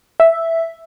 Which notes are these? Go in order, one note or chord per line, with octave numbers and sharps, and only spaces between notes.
E5